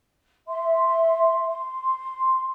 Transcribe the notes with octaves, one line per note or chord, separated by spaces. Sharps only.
E5 C6
C6